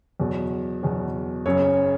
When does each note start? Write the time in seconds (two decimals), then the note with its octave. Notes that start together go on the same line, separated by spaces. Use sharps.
0.20 E2 B2 F#3
0.83 E2 B2 F#3
1.46 F#1 F#2 C#3 C#5